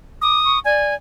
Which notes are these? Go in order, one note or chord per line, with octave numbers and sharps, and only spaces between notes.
D6 D#6
C#6
D5 G#5